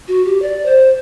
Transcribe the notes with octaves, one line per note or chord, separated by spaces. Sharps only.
F#4
G4
D5
C5